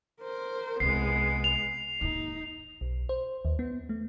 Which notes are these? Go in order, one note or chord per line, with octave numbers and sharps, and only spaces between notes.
A#4 C5
C2 G#3 B3 C7
F7
D#2 G#2 D#4
B1
C5
D#2
B3
A3